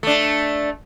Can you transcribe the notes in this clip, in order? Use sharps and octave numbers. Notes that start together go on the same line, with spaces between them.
A3 D4